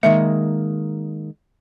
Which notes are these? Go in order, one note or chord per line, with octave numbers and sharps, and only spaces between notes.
D#3 G#3 A#3 E5